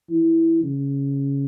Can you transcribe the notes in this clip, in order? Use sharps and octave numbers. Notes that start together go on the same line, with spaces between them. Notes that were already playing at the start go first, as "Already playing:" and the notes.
E3
C#3